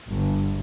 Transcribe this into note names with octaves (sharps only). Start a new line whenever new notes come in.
G1